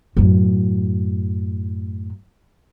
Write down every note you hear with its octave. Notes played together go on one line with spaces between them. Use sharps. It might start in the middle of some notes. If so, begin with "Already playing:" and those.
F#2 A2